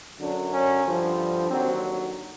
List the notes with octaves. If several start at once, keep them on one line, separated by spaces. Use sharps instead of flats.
F#2 D3 F#3 D4
C#4
G2 D3 F3
D#2 D3 F#3 C4